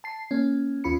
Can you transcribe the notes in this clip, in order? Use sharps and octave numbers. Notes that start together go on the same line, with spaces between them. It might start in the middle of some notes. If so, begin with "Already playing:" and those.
A5 C7
A#3 C#4
D#2 C#4 F4 B5 C#7